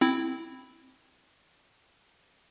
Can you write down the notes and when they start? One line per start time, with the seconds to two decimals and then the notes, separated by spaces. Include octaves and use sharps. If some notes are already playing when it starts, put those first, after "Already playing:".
0.01 C4 E4